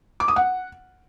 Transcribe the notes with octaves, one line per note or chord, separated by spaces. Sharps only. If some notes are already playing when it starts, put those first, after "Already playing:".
D6
D#6
F#5